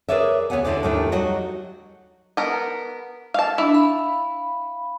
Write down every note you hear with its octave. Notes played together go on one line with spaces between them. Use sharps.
G#4 A#4 B4 C#5 D5 E5
D2 B3 C#5 E5 F#5 G#5
D#2 G#2 D3 E4 C5 D5
D#2 G#2 D#3 A3 D4 E4
F#3 G3 F#4 C#5 D#5 F#5
B3 A#4
F5 A5
D4 E4
F5 B5